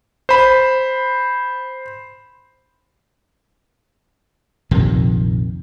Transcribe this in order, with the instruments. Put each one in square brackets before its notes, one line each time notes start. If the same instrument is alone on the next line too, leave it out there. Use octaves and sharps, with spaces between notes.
[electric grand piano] C5 B5
[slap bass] A#1 F2 C3 D#3